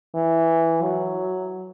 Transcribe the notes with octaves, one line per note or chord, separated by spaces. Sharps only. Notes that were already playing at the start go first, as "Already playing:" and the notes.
E3
F#3